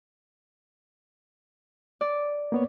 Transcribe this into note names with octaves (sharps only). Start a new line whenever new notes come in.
D5
A#3 B3 C#5